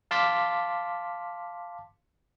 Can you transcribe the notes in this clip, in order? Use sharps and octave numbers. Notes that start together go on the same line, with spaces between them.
F5 A5 C6 D6 A6 B6